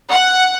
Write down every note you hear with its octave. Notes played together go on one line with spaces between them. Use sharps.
F#5